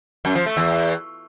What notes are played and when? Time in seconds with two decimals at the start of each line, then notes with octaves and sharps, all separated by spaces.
0.25 F#2
0.35 F3
0.46 A3
0.57 E2